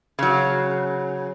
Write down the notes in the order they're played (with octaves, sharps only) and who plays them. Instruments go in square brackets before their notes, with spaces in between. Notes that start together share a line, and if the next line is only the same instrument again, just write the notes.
[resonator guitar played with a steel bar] C#3 F#3